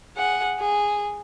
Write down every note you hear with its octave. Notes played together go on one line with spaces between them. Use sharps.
G#4 F#5
G#4